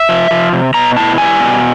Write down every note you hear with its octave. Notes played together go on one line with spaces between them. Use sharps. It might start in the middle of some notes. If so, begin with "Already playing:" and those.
Already playing: E5
F3
F3
C3
B2 A#5
E4 A5
G3 G#5
B2